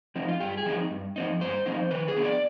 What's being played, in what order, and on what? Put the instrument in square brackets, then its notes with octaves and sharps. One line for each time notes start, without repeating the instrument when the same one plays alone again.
[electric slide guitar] F3 C4 D#4
F4
G2 G4
G#4
F3 C4 D#4
G2
F3 C4 D#4
G2 C5
F3 C4 D#4
D#3 B4
G#4
B3 D4
D5